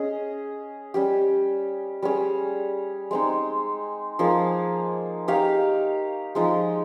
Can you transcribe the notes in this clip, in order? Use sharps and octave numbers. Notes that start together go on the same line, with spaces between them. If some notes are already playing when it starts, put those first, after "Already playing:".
Already playing: C#4 G#4 D#5
G3 C#4 G4
G3 C#4 G#4 C#5
G#3 C4 D#4
F3 A#3 D#4 G#4
D#4 G4 C#5 F5
F3 G#3 D#4 G#4